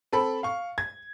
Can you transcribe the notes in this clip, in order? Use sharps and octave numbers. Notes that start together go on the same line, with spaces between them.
C4 A4 B5
F5 C#6
G#6